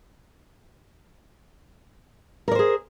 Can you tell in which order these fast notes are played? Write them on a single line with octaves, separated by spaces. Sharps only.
A#4 D5 C5 G#4